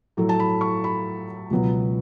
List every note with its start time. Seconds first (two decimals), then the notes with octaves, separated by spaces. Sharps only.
0.17 A2 F#3 A3
0.29 A5
0.40 B5
0.61 C#6
0.84 B5
1.51 C#2 B2 F#3 B3